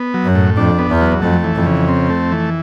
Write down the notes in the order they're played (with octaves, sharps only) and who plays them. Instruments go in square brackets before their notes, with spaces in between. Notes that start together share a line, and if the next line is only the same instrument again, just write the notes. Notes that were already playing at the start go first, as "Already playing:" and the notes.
Already playing: [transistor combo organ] B3
F#3
[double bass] F#2
[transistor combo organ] A2
[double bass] F2 [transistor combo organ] D4
[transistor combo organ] B3
[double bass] E2
[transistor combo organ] F#3
[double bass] F2 [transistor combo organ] A3
[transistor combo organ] E3
[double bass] F2
[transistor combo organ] C#3
C4
A3
E3